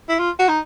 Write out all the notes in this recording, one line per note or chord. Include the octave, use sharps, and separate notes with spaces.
E4
F4
F#4
D#4